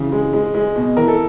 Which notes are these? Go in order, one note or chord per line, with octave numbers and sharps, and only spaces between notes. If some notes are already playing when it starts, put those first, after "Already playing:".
Already playing: C#3 E3
G#3
G#3
G#3
B2
E3 A#4
A4